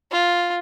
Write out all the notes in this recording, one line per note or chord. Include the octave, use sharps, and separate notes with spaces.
F4